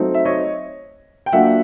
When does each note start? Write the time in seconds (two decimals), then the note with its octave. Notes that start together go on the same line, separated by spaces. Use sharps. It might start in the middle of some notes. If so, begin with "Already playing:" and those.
Already playing: F#3 A3 C4 D#4
0.14 E5
0.25 C#5 D#5
1.26 G5
1.33 F#3 A#3 D4 F4 E5 F#5